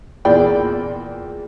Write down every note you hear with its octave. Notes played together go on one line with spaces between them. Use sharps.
E2 A#2 G#4 D5 G5 B5